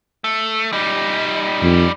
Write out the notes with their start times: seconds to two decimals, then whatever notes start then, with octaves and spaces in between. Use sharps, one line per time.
0.24 A3
0.73 G3 D#4
1.62 F2